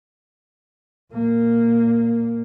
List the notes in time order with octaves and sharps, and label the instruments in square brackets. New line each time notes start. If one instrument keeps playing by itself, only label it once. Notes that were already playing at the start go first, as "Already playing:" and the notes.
[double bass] A#2 A#3